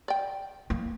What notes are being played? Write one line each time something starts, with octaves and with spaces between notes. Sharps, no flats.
D5 G5
A#3